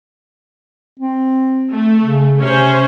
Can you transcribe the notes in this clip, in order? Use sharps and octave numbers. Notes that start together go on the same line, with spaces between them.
C4
A3
C#3
C3 C#4 C5